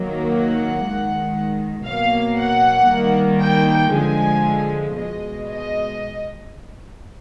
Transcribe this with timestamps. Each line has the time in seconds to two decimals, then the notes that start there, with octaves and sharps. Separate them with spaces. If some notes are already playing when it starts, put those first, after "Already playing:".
Already playing: D#3 F#3 A#3
0.31 F#5
0.83 D#3 G#3
1.86 B2 F#3 A#3 F5
2.39 F#5
2.89 D#3 G3 A#3
3.42 G5
3.93 D3 F3 G#3 G#5
4.96 B2 G#3 D#5
5.48 D#5